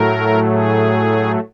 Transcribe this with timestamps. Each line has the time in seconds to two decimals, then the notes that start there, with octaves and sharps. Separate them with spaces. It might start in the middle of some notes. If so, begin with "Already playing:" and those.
Already playing: A2 F#3 A3 A#4
0.49 G#4